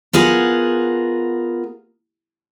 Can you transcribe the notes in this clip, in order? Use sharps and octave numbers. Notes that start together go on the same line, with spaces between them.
B3 F4 G#4 A#4 F#5